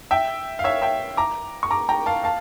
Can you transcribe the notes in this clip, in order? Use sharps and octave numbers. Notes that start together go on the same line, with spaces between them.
E5 G5
F5
C#5 E5
E5 G5
A#5 D6
C#6
A#5 D6
G5 A#5
F5 A5
F5 A5